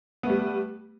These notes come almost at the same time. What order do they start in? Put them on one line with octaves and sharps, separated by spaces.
B3 A3 G3